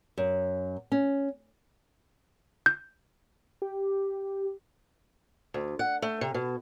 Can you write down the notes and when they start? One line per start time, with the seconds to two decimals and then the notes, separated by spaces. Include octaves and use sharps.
0.18 F#2
0.92 C#4
2.66 G6
3.62 G4
5.54 D2
5.79 F#5
6.02 A3
6.21 C3
6.34 B2